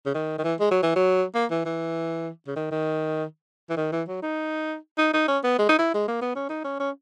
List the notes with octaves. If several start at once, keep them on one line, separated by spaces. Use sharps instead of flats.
C#3
D#3
D#3
E3
G#3
F#3
E3
F#3
A#3
E3
E3
C#3
D#3
D#3
E3
D#3
E3
F#3
D#4
D#4
D#4
C#4
B3
G#3
D#4
E4
G#3
A#3
B3
C#4
D#4
C#4
C#4